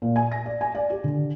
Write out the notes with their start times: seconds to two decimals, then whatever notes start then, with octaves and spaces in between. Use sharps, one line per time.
0.02 A#2
0.16 G#5
0.32 A#6
0.46 D5
0.61 G#5
0.75 D5
0.90 G4
1.04 D3